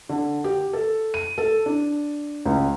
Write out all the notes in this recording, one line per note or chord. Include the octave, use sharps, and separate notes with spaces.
D3
G4
A4
D#7
A4
D4
C#2